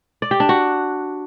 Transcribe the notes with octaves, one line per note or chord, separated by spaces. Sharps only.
D5
G4
D4
F#4